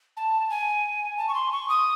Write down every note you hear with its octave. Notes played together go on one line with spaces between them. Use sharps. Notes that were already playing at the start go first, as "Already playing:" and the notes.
A5
G#5
A5
C#6
C6
C#6
D#6